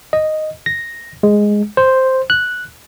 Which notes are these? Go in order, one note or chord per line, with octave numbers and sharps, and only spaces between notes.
D#5
A#6
G#3
C5
F#6